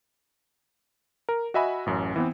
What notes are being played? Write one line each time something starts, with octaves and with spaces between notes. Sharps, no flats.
A#4
F#4 D#5 E5 G#5 B5
A1 F#2
E3 B3 C4